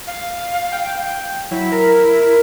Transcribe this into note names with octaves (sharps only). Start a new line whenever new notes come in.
F5
G5
F#3 E4
A#4